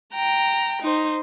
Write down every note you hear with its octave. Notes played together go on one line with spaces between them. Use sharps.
G5 A#5
D#4 C5